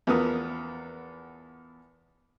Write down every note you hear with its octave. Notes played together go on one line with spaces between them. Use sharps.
E2 F3 B3 A#4 D#6